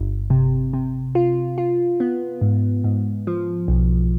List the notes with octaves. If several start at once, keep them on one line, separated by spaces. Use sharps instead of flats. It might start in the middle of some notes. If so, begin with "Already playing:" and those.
Already playing: G1
C3
C3
F4
F4
B3
G#2
G#2
F3
B1